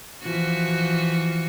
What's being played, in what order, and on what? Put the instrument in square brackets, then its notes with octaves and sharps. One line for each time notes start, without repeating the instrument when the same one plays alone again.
[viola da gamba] E3 F3 F#4